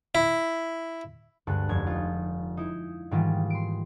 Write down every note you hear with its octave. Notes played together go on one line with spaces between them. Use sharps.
E4
D2 G2 G#3 A4 F#6
F1 G#6
D#4 F4
D#4 E4
G#2 D#3 E3 G3 A#3 F4
C6 D7